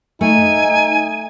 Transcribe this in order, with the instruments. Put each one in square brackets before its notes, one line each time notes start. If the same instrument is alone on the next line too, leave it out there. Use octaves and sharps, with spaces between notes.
[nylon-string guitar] A3 [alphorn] D#4 [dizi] G#5